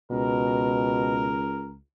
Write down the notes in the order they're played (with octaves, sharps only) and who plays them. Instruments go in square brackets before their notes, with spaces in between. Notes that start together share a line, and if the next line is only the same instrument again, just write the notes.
[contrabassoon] C#2 [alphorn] B2 [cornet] A#4